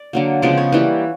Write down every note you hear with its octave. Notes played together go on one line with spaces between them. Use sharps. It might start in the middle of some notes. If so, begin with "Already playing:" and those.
Already playing: D5
D3 F#3 A#3
C#3 F3 G#3 B3 D5
C#5
E3 G3 A#3 B4